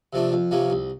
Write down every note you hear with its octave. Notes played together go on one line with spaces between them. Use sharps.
C3 F3 A3 D4
F2
C3 F3 A#3 C#4
C2